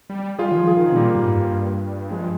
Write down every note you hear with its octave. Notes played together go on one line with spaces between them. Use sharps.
G3
G3 F4 G#4
D#3
F3
F4 G#4
D#3
C3
A#2 G3 A#3
G#2
G2
F3 G#3